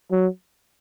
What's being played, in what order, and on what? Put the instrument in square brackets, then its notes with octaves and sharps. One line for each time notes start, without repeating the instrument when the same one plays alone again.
[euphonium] F#3